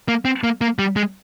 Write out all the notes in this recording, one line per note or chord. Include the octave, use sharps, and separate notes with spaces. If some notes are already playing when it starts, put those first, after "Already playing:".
A#3
C4
A#3
A#3
G3
G#3